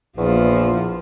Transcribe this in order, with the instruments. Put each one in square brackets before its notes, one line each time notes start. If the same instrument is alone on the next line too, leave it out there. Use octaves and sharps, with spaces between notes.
[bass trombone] A#1 [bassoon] E2 [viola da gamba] F3 [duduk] F4